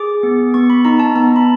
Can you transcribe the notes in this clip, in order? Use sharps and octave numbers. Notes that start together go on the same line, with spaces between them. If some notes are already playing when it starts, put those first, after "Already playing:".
Already playing: G#4 D6
B3
B3 C#6
B5
D#4 A#5
A5
B3 A#5
B5